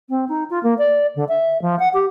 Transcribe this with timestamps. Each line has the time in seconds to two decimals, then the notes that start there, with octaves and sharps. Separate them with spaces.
0.09 C4
0.28 D#4
0.50 F4
0.63 A#3
0.78 D5
1.15 D3
1.28 E5
1.62 F3
1.79 F#5
1.94 G4